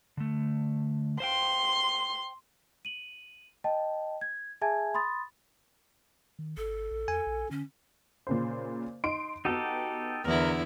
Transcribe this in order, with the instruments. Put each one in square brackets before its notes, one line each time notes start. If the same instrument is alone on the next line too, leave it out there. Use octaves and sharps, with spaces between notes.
[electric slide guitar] D3 A3
[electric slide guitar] C5 F5 G5 [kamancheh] C6
[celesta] D#7 F#7
D#5 G5 A5
G#6
G#4 E5 G#5 A5 G#6
B5 C6 D#6 A6
[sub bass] D#3
[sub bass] G#1 [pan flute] A4
[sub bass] A#1
[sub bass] E2 [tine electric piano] G#5
[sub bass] A#1
[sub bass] D3 [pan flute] C#4
[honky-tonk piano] A#2 C#3 C5
D#4 C6 D7
[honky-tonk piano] B3 F#4 [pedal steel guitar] D#4 G4 A4
[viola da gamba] E2 D3 E4 [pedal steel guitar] A#4